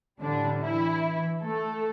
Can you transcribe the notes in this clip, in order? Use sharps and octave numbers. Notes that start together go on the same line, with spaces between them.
A2 D3 G3 D4
E3 E4
A3 A4